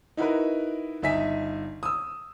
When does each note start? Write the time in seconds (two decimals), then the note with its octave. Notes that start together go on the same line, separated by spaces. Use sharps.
0.17 D#4 E4 F#4 A#4 B4
1.02 G1 D#4 E5 G#5 B6
1.83 D#6 E6